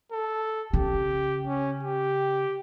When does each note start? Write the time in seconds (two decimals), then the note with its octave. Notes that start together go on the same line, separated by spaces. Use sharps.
0.12 A4
0.73 C#3 G4
1.47 C#4
1.83 G4